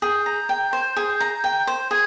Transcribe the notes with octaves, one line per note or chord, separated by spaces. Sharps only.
G#4 G6
A#5
G5
C5
G#4
A#5
G5
C5
G#4 G#6